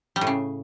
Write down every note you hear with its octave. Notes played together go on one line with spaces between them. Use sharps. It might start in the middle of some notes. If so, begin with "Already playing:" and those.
G3
A2
C#3